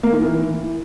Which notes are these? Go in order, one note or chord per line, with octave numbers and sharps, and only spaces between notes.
A#3
D#3
E3